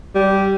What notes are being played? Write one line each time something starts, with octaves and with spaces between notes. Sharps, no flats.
G3